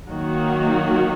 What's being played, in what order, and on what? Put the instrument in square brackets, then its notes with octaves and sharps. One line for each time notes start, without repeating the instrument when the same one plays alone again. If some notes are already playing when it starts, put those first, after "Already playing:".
[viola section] D#3 F#3 A#3 D#4 F#4